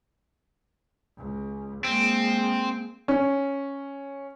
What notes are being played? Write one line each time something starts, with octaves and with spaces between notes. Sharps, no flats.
C#2
G#3 A#3 C4
C#4